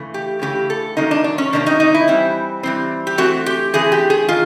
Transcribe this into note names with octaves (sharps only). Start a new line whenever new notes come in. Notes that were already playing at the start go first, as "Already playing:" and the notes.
Already playing: C#3 E3 A3
G4
C#3 E3 A3 G4
A4
C3 D#3 F#3 A#3 C#4 D#4
D4
D4
C#4
C3 D#3 F#3 A#3 C#4 D4
D#4
D#4
E4
E3 G3 C4
E3 G3 C4
G4
E3 A3 C4 F#4
G4
E3 A3 C4 G#4
G4
G#4
D#3 F4